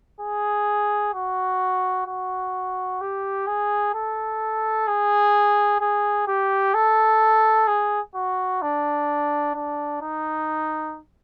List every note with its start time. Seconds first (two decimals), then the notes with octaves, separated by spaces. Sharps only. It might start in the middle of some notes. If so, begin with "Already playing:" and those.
0.20 G#4
1.14 F#4
2.07 F#4
3.01 G4
3.47 G#4
3.94 A4
4.88 G#4
5.81 G#4
6.28 G4
6.74 A4
7.67 G#4
8.15 F#4
8.62 D4
9.55 D4
10.01 D#4